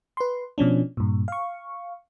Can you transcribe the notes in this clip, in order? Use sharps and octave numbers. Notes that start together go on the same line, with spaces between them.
B4 C6
B2 F3 C#4 D4
G2 A#2
F5 C#6